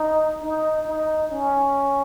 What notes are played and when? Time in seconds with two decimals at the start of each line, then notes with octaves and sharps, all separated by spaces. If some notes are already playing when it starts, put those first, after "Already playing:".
Already playing: D#4
0.44 D#4
0.87 D#4
1.31 C#4